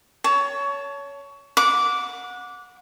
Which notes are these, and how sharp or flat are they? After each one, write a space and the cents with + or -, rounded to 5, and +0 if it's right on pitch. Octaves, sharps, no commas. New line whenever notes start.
C#5 +20 A5 -5
F#5 -25 D6 -10